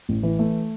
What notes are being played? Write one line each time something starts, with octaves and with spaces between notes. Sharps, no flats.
A1
E3
A3